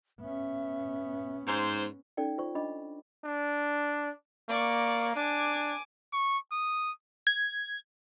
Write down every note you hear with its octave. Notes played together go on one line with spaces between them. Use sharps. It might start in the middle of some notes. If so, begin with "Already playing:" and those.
B3 C#4 E5
G#2 C5
C#4 D#4 A4 D5 G5
F4 C5 D5 C#6
D4 D#5 B5 D6
D4
A#3 D5 C#6
D4 G#5 D6
C#6
D#6
G#6